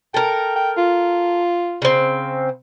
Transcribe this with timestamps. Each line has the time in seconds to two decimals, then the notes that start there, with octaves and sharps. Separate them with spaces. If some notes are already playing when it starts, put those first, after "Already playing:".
0.14 A4 A#4 G5
0.56 G5
0.77 F4
1.82 C#3 C4